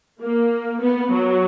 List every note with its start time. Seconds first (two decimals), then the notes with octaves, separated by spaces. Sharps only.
0.21 A#3
0.81 B3
1.12 F#3